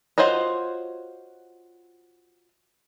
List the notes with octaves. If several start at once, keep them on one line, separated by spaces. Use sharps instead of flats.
F4 F#4 C5 C#5 D#5